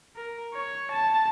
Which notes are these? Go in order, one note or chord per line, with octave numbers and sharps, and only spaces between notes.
A#4
C#5
A5